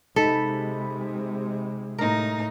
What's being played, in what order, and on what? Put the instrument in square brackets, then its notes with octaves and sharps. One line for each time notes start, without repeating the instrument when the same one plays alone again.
[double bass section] C3 G#3 [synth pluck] D#4 B5 [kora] A4
[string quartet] A2 D#4 [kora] A#4